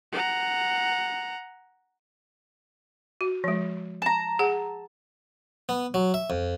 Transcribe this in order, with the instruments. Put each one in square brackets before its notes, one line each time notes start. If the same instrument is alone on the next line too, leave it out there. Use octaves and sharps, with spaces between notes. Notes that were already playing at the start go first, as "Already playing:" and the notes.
[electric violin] F#5 A#5
[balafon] F#4
F3 G#3
[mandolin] A5 A#5
[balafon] G#4 F#5
[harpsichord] B3
F#3
E5
F2